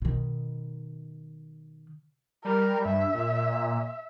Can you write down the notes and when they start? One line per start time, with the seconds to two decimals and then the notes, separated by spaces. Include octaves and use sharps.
0.02 B2 D#3
2.45 G3 A#4
2.85 G2 E5
3.15 A#2